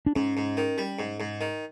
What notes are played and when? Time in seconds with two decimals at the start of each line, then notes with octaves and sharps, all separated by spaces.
0.06 D4
0.16 G#2 C#4
0.37 G#2
0.57 D#3
0.78 G3
0.99 G#2
1.20 G#2
1.41 D#3